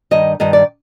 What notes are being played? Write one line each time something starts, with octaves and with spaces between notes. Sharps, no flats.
G2 D#3 D#5
G2 D#3 D#5
D5